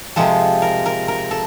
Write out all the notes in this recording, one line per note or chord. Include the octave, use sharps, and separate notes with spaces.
C3 F3 G#3 A4
A#4
A#4
A#4
A4